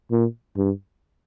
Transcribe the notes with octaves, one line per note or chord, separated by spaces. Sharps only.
A#2
G2